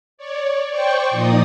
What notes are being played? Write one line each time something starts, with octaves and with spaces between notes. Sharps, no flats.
C#5 D5
C5 D5 G5 C#6
A#2 F3 D#4 D5 D#6